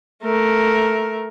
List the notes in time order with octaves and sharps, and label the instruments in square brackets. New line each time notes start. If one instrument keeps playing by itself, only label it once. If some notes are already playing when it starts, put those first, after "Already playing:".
[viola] A3 A#4